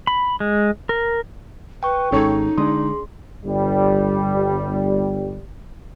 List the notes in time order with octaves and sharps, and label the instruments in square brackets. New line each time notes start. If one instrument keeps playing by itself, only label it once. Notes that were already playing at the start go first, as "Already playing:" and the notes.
[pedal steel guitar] B5
G#3
A#4
[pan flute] B4 [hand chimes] G5 C#6
[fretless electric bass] G#1 G#3 [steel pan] C#4 A4 C#5 [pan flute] D#4
[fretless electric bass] D3 G#3 [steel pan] D4 D#6 [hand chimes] G#4 C6
[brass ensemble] G1 G3